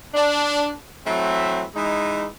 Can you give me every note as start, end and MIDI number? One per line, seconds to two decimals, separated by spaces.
0.14 0.73 62
1.06 1.64 52
1.06 1.64 54
1.06 1.64 57
1.06 1.64 60
1.75 2.27 52
1.75 2.27 56
1.75 2.27 63